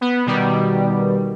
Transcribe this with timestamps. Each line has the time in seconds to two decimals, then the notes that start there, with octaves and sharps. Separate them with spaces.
0.01 B3
0.26 B2 D#3 G3